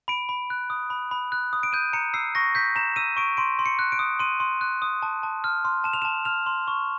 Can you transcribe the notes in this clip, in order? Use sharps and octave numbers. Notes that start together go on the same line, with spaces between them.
B5 D7
B5
F#6
D#6
B5
B5
F#6
D#6
D7
G6 D#7
A#5 C#7
E6 C7
C#6 A#6
G6 B6
A#5 E7
E6 D#7
C#6 D7
C6 D7
C6
C#7
F#6
D7
D#6
C6 D#7
C6
F#6
D#6
A5
A5
F6
C6
A5 E7
F7
A5 E7
F6 F7
C6
C#6